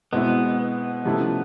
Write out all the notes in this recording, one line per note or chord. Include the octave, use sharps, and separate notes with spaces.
B2 G#3 B3 C4 E4
C3 F3 A3 C#4 E4